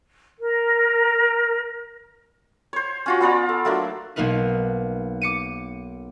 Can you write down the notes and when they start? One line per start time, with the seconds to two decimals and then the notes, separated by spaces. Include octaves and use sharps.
0.40 A#4
2.73 C5 C#5
3.06 C#4 F4 F#4
3.21 B3 F4 D5 A#5
3.49 A4
3.65 F#3 A3 A#3 D4
4.16 B1 A#3 D#4 A#4 B4
5.22 D6 C#7 D#7